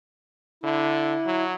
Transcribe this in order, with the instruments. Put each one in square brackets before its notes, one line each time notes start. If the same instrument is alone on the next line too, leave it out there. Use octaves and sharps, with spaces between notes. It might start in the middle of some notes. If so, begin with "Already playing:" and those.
[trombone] D3 [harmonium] E4
[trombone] F#3